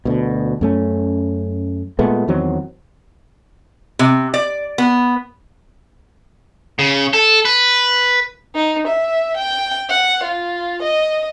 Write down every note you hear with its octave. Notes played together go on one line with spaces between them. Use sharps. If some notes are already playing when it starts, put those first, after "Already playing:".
D2 B2
F#2 A3 C#4
A#2 G#3 A3 B3
E2 D#3 F#3 C4
C3
D5
B3
C#3
A4
B4
D#4
E5
G5
F#5
F4
D#5